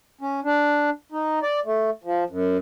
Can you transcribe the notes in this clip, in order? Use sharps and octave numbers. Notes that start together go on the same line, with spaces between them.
C#4
D4
D#4
D5
A3
F3
F#2